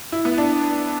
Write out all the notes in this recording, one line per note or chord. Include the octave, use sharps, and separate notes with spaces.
E4
B3
D4